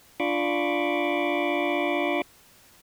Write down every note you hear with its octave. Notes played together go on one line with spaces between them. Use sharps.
D4 F4 B5 C#6 D6